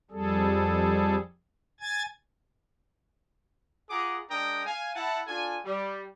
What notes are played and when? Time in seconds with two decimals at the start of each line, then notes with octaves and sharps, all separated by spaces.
0.11 F2 G3 G#4 A4
1.80 G#5 G#6 A6
3.90 F4 G#4 F#5 A#5 D6 D#6
4.30 G#3 D4 A#4 G5 A#5 D#6
4.66 F5 G#5
4.95 E4 F#5 A5
5.27 D4 F4 A4 G#5
5.65 G3